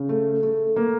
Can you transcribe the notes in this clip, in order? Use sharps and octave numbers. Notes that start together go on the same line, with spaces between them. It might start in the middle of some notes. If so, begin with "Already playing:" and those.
Already playing: C#3
A3
A3
A#3